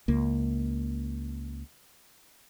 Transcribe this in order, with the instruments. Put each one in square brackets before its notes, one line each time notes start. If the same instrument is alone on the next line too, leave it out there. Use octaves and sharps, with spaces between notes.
[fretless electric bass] C#2 A#3